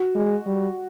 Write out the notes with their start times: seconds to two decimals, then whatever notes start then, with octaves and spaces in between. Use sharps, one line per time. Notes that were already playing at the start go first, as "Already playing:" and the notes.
Already playing: F#4
0.15 G#3
0.46 G3